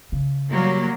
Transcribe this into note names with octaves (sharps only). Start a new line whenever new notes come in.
C#3
F#3 G3 A#3